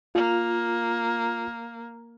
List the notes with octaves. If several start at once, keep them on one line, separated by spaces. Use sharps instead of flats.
A#3 F4